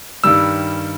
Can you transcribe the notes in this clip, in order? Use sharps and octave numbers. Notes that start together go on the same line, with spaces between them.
G2 D#3 G3 E6